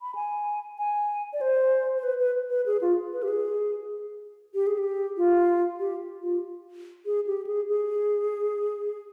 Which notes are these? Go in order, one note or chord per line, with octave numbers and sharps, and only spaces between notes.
B5
G#5
G#5
D5
C5
C5
B4
B4
B4
G#4
F4
B4
G4
G#4
G4
G#4
G4
F4
G4
F4
G#4
G4
G#4
G#4